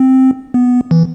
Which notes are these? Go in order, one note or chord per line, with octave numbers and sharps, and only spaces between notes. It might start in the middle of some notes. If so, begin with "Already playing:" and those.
Already playing: C4
B3
E3